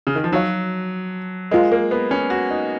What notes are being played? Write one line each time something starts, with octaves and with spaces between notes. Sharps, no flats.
C#3
D#3
F3
F#3 D#4 F#4 C#5 F5
G#3 F4 A#4 D#5
A#3
B3
C#4
F#4
D#4